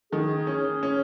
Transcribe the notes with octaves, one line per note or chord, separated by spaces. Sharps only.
D#3 G#4
C#4
C#4